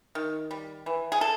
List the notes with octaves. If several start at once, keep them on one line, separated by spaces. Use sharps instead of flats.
D#3
G3
E3
G#4
A4